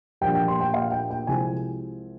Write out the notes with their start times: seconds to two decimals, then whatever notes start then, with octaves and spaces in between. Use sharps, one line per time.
0.21 A#1 A#2 G3 G5
0.35 G5
0.48 C6
0.60 G5
0.74 F5
0.92 G5
1.11 G5
1.27 C2 C3 F3 G#3 G#5